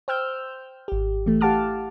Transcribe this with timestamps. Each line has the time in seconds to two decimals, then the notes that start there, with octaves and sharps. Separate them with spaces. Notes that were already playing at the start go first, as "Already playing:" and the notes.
0.08 C5 G5 E6 F6 G6
0.88 G#1 G4
1.26 E3 A3
1.41 G4 F5 F#5 A5 D6 F6